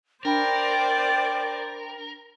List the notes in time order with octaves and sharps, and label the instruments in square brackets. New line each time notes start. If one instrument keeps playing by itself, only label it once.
[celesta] D4 B5 [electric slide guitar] A#4 [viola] C5 D5 [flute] G5